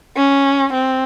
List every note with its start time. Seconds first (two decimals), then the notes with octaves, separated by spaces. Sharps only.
0.17 C#4
0.72 C4